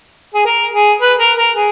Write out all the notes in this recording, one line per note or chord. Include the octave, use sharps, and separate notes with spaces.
G#4
A#4
G#4
B4
A#4
A#4
G#4